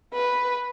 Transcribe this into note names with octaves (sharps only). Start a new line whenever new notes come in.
B4